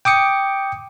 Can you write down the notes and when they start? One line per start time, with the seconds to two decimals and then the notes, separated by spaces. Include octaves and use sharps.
0.05 G5 D6 D#6 C#7